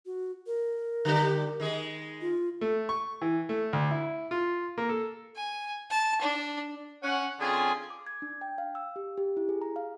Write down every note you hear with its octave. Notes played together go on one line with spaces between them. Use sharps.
F#4
A#4
D3 G3 G4
D#3 G#3 G#4
F4
A3
C#6
E3
A3
D2
E4
F4
A#3
A4
G#5
A5
D4
C#4 F#5
D3 C4 C#4 F4 G#4
D6
G#6
D4
G5
F5
E6
G4
G4
E4
G#4
A#5
F5